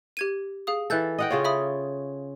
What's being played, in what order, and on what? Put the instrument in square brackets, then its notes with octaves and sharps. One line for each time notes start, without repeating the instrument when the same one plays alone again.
[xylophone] G4 G#6 D#7
G#4 F5 D#6
[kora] E3 A4 [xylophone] F#6 G6 A6
[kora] D#5 F#5 G5
C#3 F4 C#5
[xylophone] E5 B5 D#6